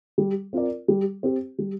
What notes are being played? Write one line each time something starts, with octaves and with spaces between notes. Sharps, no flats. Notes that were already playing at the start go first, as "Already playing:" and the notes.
G3
C4 F4 A#4 D5
G3
C4 G4
G3